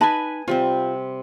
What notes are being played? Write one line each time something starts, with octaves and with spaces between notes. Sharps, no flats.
D#4 B4 G#5 A5 B5
C3 G3 C4 F4